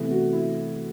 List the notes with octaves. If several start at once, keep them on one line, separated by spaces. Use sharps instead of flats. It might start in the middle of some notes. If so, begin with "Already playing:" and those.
Already playing: C3 E3 A3 B3
F#4
E4